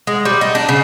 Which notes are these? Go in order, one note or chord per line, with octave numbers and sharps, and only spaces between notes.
G#3
G3
D#4
D4
C#3